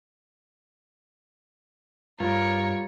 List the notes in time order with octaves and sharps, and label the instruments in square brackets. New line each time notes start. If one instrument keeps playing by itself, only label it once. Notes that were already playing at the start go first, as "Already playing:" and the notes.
[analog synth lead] G2 [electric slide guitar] G3 F4 [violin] A#4 [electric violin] C#5